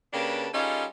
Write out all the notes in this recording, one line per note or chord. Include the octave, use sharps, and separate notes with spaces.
C#3 A#3 D4 G4 B4 A5
G3 C#4 D#4 F4 G#4 A4